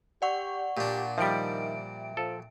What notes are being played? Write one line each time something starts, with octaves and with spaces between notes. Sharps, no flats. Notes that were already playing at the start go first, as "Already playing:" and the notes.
G4 D5 F#5 C#6
A#2 D4 G4
D#3 F3 G3 E5 G5 D7
F3 A4